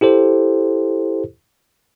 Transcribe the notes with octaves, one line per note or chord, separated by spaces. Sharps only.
E4 G4 A4 C5